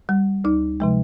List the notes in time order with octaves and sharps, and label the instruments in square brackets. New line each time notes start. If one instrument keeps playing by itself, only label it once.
[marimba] G3
D2 D#4
C3 F3 G#3